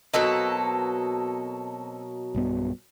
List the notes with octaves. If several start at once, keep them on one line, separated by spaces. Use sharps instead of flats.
B2 F#3 A#3 C4 A4 B4 D#5
B1 G2 B3